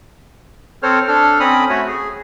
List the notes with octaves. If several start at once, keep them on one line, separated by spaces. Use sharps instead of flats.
C4 A4 C5 C#5 F6
D4 A4 F6
C4 C#4 B5 D#6
A3 F#4 C#5
G#4